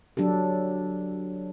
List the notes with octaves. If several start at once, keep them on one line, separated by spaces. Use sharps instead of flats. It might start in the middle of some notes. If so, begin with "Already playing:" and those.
F#3 D4 G4 A4